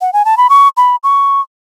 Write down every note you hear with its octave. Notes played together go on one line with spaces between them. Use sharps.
F#5
G#5
A5
B5
C#6
B5
C#6